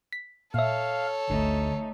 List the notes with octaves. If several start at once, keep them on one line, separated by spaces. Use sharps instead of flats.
B6
A#2 A4 C#5 E5 F5
G#1 D2 A3 D#4